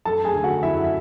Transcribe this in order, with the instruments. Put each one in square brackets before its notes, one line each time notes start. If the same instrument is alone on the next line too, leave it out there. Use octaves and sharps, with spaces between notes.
[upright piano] F#2 A4 A5
G#4 G#5
D3 A3
F#4 F#5
F#2 E4 E5
E5